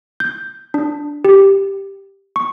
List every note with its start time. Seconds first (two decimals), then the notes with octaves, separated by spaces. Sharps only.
0.20 G6
0.74 D4
1.25 G4
2.36 C#6